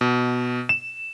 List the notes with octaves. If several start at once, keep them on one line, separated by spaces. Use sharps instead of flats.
B2
E7